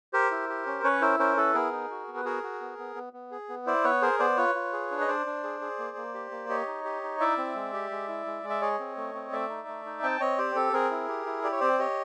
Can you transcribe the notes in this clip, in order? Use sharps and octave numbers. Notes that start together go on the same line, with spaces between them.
G4 A#4 C5
E4
G4
C#4
C#4 B4 C#5
E4 A#4 C5
C#4 A#4 C5
E4 A4 B4
B3 G#4 A#4
D#4
F#4
B3
B4
F#4 G#4 A#4
F#4
B3
B3
B3
B3
G#4
B3
E4 C5 D5
B3 B4 C#5
G#4 A#4 C5
B3 C5 D5
F4 B4 C#5
F4
G#4
D4
D#5
D4 C5 D5
D4
G#4
G#4
A#3
A#3
G4
A#3
G4 C#5 D#5
D#4
G4
D#4
E4 D5 E5
C4
G#3
G4
G#3
E4
G#3
G#3
E5
G#4 C#5 D#5
C4
A3
C4
A3 D5 E5
D#4
A3
D#4
C4 G5 A5
C4 C#5 D#5
G4 C5 D5
C4 A4
C4 G#4 A#4
E4
G4
E4
G4 D5
C#5
C4 C5 D5
G4 C#5 D#5